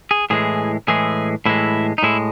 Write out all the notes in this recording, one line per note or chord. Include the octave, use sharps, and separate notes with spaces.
G#4
A2 E3 G#3 G#4
A2 E3 G#3 G#4
A2 E3 G#3 E4
D#4
A2 G#3 E4